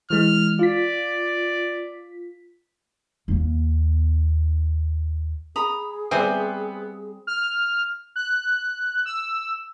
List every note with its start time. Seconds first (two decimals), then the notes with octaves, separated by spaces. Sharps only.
0.10 E3 G#3 F6
0.59 F4 D5 B6
3.28 D#2 A#3
5.56 G#4 A#5 B5 D#6
6.11 G3 B3 C4 C5 E5 G#5
7.27 F6
8.16 F#6
9.05 E6